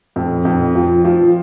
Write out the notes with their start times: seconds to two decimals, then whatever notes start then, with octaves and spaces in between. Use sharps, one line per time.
0.16 F2
0.45 F2
0.75 F3
1.05 F3